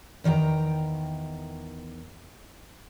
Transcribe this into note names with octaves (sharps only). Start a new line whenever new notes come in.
E2 D#3 C#5 G5 A#5